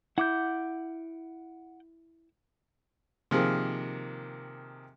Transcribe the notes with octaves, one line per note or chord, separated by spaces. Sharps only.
E4 F#5 D6 G6
C3 D#3 F3 A#3 G#4 A#4